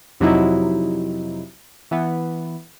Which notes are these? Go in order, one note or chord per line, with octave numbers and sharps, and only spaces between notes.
F2 C3 F#3 D#4 E4
E3 B3